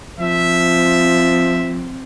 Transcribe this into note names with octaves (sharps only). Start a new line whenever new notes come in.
F3 C4 E5